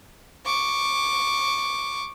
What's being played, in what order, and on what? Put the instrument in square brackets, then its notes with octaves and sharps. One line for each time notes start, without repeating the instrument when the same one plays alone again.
[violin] C#6 D6